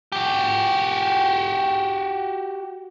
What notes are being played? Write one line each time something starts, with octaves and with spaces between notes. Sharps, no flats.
F#4 G4